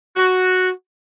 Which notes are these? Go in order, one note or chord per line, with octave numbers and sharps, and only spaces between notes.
F#4